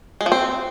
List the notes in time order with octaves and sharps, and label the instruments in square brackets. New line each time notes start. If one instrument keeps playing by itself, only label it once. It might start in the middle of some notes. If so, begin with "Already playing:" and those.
[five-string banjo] G#3
F3
C4